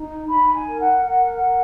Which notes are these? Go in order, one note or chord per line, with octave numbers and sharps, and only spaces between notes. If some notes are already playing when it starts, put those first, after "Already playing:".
Already playing: D#4
D#4 B5
G#5
A#4
F#5
A#4 F#5
A#4